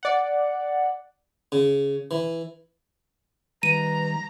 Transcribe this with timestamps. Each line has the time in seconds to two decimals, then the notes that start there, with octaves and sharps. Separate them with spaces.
0.03 D5 F#5
1.52 C#3
2.11 E3
3.63 D#3 G3 B4 A#5 D#7